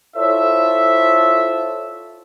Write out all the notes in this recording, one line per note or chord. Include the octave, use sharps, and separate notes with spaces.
E4 F4 A4 C5 C#5 E5